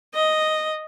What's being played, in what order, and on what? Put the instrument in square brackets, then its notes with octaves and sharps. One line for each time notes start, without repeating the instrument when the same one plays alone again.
[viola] D#5